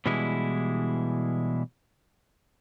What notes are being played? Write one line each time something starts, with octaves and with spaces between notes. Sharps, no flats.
B2 E3 G3 G#3 E4